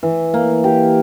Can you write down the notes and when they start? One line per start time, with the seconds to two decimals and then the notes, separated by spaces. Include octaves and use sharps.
0.03 E3
0.34 A#3
0.64 G4